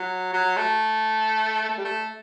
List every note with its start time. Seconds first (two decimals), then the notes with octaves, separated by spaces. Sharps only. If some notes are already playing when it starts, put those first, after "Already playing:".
Already playing: F#3
0.33 F#3
0.57 A3
1.69 A3
1.77 G3
1.84 A3